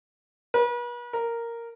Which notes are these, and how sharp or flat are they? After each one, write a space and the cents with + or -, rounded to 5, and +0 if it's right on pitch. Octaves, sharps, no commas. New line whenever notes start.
B4 -40
A#4 -5